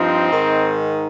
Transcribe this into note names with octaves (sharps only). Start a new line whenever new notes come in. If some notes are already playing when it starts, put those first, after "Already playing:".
Already playing: G2 F3 C4 D#4
G#2 D#3